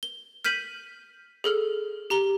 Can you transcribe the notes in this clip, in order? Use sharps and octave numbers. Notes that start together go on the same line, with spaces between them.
G7
F6 G6 B6 D#7 F#7
G#4 A4 F6
G4 A#5 G7